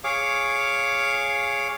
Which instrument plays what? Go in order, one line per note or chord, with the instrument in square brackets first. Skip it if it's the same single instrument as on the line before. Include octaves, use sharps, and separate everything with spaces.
[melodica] G#4 C#5 F5 D6